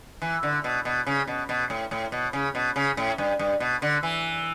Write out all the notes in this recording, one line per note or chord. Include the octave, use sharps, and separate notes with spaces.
E3
D3
B2
B2
C#3
B2
B2
A2
A2
B2
C#3
B2
C#3
A2
G2
G2
B2
D3
E3